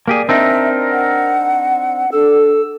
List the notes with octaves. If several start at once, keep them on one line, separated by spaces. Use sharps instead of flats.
A#3 G4 G#4 D5
C4 D4 D#4 A#4 E5
F#5
D4 A4 E6